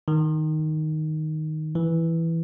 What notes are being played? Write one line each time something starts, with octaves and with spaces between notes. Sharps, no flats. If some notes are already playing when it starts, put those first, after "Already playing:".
D#3
E3